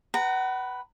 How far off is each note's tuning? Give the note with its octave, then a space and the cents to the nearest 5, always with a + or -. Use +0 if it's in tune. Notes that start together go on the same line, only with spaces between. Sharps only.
B4 +0 F#5 +35 A#5 -20